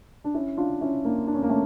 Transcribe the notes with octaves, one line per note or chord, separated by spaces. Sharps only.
D4
C#4 E4
D4 F4
C#4 E4
A#3 D4
D4
C#4
A#3
A3 C#4